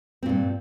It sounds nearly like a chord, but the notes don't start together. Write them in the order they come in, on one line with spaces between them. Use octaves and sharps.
C4 A#2 G2